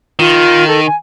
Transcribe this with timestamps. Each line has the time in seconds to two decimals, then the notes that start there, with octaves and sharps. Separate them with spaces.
0.19 D#3 F4
0.68 A4
0.86 G#5